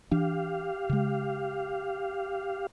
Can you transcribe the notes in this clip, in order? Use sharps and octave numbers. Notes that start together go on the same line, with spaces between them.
E3 D4 G4 F5
C#3 G#3